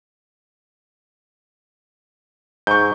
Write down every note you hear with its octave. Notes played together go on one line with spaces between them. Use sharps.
G#2 C#6 G6